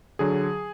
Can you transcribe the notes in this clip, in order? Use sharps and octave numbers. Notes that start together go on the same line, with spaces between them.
D3 F#3 G#4